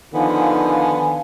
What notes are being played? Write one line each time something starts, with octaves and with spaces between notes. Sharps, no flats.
D3 D#3 F3 B3 F5 G#5